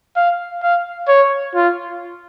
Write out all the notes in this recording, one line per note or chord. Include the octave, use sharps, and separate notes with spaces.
F5
F5
C#5
F4